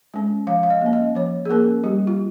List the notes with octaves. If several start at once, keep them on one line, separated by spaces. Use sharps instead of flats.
G#3 C#4
F3 F5
F5
D#5
A#3 C#4
D#5
F3 C#5
G#4
A#3 C#4 A#4
G3 G4
F4